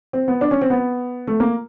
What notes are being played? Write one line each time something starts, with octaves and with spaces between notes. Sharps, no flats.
C4
B3
D4
C#4
C4
B3
A3
A#3